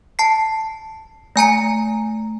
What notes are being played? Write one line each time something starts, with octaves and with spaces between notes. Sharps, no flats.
A5 C7
A3 G#5 A#5 C#7